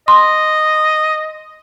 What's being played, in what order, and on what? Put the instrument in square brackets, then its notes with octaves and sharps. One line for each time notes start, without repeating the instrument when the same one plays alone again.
[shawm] D#5 [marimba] C6